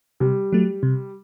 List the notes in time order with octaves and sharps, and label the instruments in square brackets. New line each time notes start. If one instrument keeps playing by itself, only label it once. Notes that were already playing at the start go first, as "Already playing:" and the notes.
[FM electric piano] C3 [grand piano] G3
[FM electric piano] F#3 A3
C3